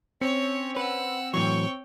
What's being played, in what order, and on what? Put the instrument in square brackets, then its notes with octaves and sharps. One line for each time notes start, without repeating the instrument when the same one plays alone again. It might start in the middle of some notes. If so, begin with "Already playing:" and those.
[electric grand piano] C4 C#7 [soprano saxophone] C#4 [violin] C#5
[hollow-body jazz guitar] B4 [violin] F#5 E6
[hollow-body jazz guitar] A2 E3 F#3 [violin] C#5 G5 [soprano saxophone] C#6